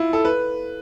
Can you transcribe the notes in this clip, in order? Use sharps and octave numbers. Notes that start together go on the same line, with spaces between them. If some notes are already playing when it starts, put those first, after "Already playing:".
Already playing: E4 F4
A4
B4